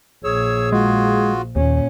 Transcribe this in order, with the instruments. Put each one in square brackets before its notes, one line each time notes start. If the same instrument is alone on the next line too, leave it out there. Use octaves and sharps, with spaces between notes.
[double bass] A#1 [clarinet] G#4 [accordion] C#5 E6
[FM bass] G#3 [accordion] F4 F#4
[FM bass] D#2 [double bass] A#2 C#4